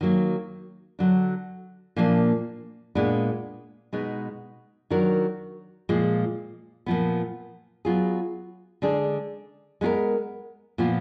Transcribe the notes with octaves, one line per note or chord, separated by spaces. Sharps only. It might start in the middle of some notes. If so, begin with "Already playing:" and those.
D#3 F#3 A#3
D3 F#3 D4
A#2 F3 A#3 D4
A#2 G#3 B3 D4
B2 G#3 B3 D#4
D#3 F#3 D4 F#4 A#4
A#2 F3 G#3
A#2 F3 B3
F#3 B3 F4 G#4
D3 G#3 D4 G#4
G#3 B3 F4 A#4
A#2 F3 B3 F4